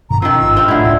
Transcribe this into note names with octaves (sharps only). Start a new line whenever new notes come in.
G2 B2 D#3 A#5
D#3 F3 C#4 E6
G#1
C4 D4 D#4 F4
A2 D3 E4
D#1 C#2 E6